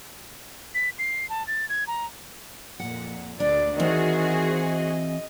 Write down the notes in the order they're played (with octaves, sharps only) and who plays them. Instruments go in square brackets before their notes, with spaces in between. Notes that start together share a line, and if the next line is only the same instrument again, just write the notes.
[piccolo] B6
C7
A5
A6
G#6
A#5
[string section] F2 A#2 [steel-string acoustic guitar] F#5
[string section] D2 [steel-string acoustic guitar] D4 [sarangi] D5
[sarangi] D#3 [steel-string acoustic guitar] E3 C4 [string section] F#4 G#4 C5
[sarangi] D#5